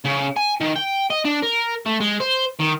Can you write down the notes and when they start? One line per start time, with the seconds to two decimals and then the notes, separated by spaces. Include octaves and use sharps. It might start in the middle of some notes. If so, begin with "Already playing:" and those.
0.05 C#3
0.36 G#5
0.60 D#3
0.76 G5
1.10 D#5
1.25 D4
1.42 A#4
1.86 A3
2.00 G#3
2.20 C5
2.59 D#3